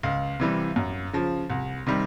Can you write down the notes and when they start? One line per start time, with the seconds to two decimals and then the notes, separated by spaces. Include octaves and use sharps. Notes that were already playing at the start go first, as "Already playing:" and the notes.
0.03 C#2 F5
0.40 C3 E3 G3
0.76 F#2
1.13 C#3 F3
1.50 C2
1.87 C3 D#3 G3